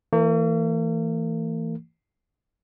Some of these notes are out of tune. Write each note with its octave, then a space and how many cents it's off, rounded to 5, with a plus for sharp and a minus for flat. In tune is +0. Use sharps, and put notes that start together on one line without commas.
E3 +0 A#3 -45